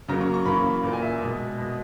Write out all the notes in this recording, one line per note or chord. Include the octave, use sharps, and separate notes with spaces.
C#3 F#3 A#3 A#5
C#6
C#6
C#3 E3 A#3 B5
A#2 A#3
G#5
E5
B2 G#3
B2 G#3